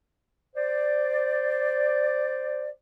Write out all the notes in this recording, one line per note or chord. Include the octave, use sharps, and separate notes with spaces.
C5 D5